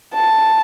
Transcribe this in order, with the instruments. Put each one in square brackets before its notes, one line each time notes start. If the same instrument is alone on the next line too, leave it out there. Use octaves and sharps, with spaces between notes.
[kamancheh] A5